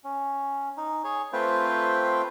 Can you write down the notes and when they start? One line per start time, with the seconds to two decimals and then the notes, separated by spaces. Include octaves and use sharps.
0.04 C#4
0.77 D#4
1.04 G#4 C#5
1.33 A3 C4 F4 B4 C5 G5